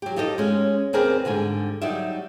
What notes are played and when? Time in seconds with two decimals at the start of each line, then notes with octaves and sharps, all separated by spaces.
0.02 F#3 G4
0.16 D#4 F4 G4 A4 C#5 D#5
0.38 G#3 C#4
0.93 D#2 C4 G#4 A#4 B4 D5
1.25 G#2 D3 G3 G#5
1.81 F#3 G3 D#4 D5 E5